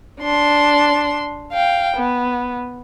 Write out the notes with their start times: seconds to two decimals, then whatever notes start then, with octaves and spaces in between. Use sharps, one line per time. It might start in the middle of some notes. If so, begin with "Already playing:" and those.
0.21 D4 C6
1.52 F5 G5
1.97 B3